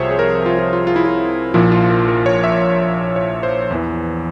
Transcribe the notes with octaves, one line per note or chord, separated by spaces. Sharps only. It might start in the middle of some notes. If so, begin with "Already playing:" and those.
Already playing: C2 C3 F3 G#4 C5 C#5 E5
G#4
A#4
F4
F4
F4
F4
E4
F4
A#1 A#2 F3 E4
F4
A#4
A#4
C#5
E5
C#5
C5
E2 E3